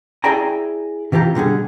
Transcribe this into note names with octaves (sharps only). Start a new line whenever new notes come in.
E4 G#4 D5 G5 G#5 A#5
C3 E3 F4 G4 A#5
B2 D3 G3 G#4